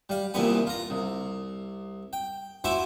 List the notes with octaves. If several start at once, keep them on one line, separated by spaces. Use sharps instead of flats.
G3 F5
C2 A#2 E3 G3 B3 G#5
F4 A#5
C2
G5
E4 F#4 C5 E5 G#5 D6